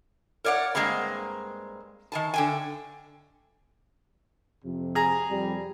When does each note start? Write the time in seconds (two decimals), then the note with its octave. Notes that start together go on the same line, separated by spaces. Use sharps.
0.44 A#4 C#5 D5 F5 F#5
0.75 G2 G#3 A#3 C4 A#5
2.12 D#3 G#5 A5
2.34 D3 G5 G#5
4.65 F2 C3
4.95 G#4 A#5
5.30 F2 G3